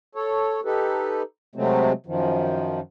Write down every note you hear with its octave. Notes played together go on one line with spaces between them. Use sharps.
A4 C#5
D#4 G4 A4 B4
C3 F#3 G#3 A3 C4
F#2 D#3 F3